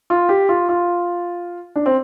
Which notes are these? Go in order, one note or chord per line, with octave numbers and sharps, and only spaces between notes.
F4
G4
F4
F4
D4
C4